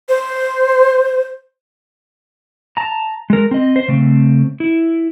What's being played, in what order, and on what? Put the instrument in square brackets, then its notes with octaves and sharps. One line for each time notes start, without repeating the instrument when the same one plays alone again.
[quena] C5
[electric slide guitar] A5 A#5
G#3 A#4
C4 D#5
C5
C#3 A3 C4
E4